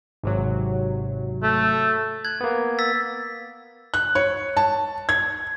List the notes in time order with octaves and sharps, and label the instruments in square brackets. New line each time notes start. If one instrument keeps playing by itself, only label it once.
[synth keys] G#1 C3 F#3
[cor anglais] A3
[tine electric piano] F#6 [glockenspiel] G#6
[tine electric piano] A#3 B3
[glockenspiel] E6 A6 B6
[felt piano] F#6
C#5
A5
G#6